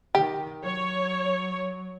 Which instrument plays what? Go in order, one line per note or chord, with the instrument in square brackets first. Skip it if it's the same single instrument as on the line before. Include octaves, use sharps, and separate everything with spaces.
[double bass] D#3 [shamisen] G4
[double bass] F#3 [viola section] C#5